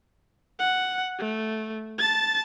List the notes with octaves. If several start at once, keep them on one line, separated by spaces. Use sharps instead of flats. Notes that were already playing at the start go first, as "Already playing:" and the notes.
F#5
A3
A5 A6